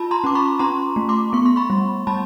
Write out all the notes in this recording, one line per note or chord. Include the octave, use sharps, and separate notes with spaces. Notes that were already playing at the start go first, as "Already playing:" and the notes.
Already playing: F4 A5 B5
A#5 C6
C#4 D6
B5 C#6
C#4 A#5 C6
A3
C6 D6
B3 C#6
C6
B5 C#6
G3
G3 A5 B5